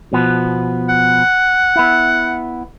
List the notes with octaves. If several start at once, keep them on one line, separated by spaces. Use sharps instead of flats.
B2 F3 B3
F#5
B3 E4